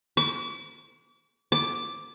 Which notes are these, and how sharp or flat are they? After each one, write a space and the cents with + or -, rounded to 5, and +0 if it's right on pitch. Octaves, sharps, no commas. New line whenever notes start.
D6 -40
D6 +0